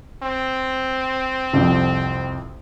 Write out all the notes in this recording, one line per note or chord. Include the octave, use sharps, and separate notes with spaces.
C4
C2 F2 F3